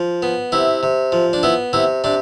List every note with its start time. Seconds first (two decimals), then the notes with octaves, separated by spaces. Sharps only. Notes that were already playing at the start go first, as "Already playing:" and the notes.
Already playing: F3
0.22 B3
0.52 C3 E4
0.83 C3
1.12 F3
1.33 D4
1.43 B3 E4
1.73 C3 E4
2.04 C3 D4